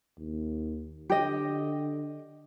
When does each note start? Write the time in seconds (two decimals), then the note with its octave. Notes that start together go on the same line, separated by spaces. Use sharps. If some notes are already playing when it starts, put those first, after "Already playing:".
0.18 D#2
1.10 D3 G4 D#5